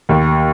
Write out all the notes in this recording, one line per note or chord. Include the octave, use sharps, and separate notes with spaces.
D#2